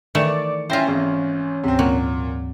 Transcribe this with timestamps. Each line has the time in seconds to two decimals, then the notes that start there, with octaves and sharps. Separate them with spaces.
0.15 D#3 E3 A3 D5 C#7 E7
0.70 C#4 E4 F4 C5 G5 A#6
0.88 G#1 G#2 E3
1.64 D2 G#2 C3 C4
1.79 A#2 F#3 C4 F#5